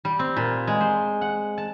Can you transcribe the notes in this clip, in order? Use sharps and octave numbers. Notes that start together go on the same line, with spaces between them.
G3
C4
A#2
G#3
C5
F#5
A5